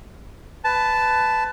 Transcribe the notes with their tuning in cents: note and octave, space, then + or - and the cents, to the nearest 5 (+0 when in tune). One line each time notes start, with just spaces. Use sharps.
B4 +15 A5 -5